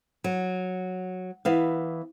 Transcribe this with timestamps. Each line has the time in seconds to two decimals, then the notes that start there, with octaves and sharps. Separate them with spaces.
0.24 F#3
1.45 E3 B3 F5